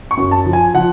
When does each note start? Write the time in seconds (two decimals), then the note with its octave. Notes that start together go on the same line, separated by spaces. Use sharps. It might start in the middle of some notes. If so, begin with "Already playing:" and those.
0.11 C#6
0.17 F#2
0.31 A5
0.46 F3
0.53 G#5
0.74 F3 F#5